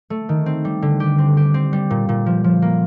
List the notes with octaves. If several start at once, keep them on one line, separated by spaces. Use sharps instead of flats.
A3
D#3
C4
G3
D3
G4
C4
G4
C4
G3
A#2
A#2
F3
F3
A#3